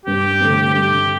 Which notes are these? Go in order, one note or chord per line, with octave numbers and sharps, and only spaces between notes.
G2 G4
D3 A3 C4
G2 G4